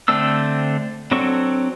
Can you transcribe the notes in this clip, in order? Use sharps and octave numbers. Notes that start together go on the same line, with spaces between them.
D3 A3 C4 D4 E6
F#3 C4 D4 A4 C#6